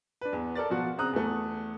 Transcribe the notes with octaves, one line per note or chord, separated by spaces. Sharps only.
D4 B4
E2
A4 A#4 D5 A6
B2 F3 F#4
C#3 C4 A#5 D#6 F#6
E2 A3